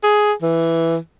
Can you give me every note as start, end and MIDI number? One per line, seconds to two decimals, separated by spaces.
0.03 0.33 68
0.42 0.97 52